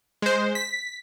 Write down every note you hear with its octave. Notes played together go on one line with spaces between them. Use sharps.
G#3 C5
B6